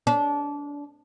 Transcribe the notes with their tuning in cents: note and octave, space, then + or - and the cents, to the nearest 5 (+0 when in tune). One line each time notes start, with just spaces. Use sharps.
D4 -25